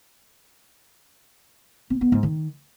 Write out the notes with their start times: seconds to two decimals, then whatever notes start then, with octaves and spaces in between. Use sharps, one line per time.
1.90 C4
2.01 B3
2.12 G#2
2.23 D#3